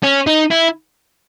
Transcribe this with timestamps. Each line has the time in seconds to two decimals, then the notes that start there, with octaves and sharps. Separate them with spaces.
0.03 C#4
0.27 D#4
0.51 E4